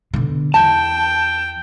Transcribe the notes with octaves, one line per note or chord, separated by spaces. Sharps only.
B2 D3
E2 G5 A5